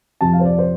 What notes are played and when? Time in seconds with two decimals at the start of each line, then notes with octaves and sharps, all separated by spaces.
0.21 F2 C3 F3 C4 A5
0.33 F5
0.40 C5
0.45 D5
0.58 C5